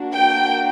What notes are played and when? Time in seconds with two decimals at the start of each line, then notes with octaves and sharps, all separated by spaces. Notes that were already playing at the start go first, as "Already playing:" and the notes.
Already playing: A#3 D4 F#4
0.13 G5